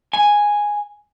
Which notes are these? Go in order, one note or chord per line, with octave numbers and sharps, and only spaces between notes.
G#5